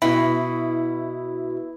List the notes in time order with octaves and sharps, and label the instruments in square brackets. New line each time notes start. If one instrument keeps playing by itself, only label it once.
[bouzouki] B2 [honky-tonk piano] E4 [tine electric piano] B5